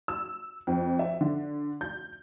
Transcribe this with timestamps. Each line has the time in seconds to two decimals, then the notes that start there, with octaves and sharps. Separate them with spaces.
0.08 E6
0.67 F2
0.99 E5
1.21 D3
1.81 G6